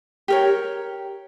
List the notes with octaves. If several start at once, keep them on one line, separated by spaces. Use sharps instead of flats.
G4 A#4 C#5